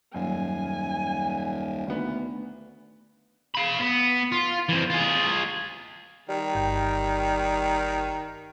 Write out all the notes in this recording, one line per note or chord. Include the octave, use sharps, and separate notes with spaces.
D#1 F#2 G#5
D2 D#3 B3
F5 B5
B3
F4
E3 C4
F4 G#4
D#3 G3
G1 G5